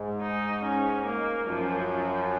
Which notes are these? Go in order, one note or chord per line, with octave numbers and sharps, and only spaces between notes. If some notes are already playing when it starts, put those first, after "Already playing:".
Already playing: G#2
D#4
C#4
A#3
F#2 F3
F3